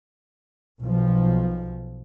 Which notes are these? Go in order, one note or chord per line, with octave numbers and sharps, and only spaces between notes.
B1 F3